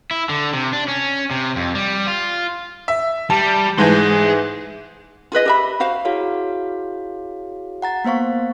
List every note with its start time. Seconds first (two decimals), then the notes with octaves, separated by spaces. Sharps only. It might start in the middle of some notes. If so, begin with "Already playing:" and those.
0.11 E4
0.29 D3
0.53 C3
0.73 D4
0.88 C#4
1.31 C3
1.56 F2
1.75 G3
2.07 F4
2.88 E5
3.30 G3 A5
3.78 G#2 E3 G#4 C6 G6
5.32 F4 G#4 B4 D#5
5.46 G4 E5 B5
5.80 F#4 C5 F5
6.05 E4 F#4 G#4 C#5 F5
7.82 F#5 A#5 A6
8.04 A#3 B3 C5 F5 C#6